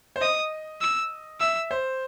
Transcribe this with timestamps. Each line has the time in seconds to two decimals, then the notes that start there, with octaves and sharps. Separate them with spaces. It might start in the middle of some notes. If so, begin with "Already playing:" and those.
0.16 C5
0.21 D#5 D#6
0.81 E6
1.40 E5 E6
1.71 C5